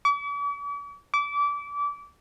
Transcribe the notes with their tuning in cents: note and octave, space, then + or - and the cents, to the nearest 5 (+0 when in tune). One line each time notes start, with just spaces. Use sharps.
D6 -45
D6 -25